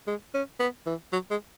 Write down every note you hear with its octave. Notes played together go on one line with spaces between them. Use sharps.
G#3
C#4
B3
E3
F#3
G#3